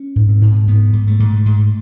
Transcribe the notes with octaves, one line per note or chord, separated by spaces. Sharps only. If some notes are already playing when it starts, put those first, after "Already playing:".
Already playing: C#4
G#2
C4
G#2
G#2 B3
G#2
A3
G#2
G#2